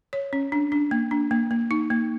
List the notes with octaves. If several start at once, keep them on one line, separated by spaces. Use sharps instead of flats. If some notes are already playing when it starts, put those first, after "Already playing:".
C#5
C#4
D4
D4
A#3
D4
A#3
A#3
D#4
A#3